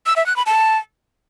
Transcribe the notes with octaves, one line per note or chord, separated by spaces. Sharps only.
E6
E5
F#6
B5
A5